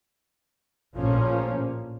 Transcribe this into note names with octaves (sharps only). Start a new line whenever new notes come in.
A#1 A2 F3 A#3 C#4